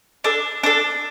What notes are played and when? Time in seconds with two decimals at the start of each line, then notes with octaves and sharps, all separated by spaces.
0.24 D4 A4
0.63 D4 A4